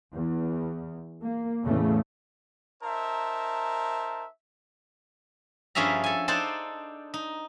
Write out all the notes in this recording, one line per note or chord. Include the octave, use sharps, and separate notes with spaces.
E2
A#3
E2 A2 C#3 A3
D#4 A#4 C5 E5 A5
G2 F3 C#4 G#4 E5 A#5
A4 G#5
D4 D#4 A4 C5 D5 A5
D#4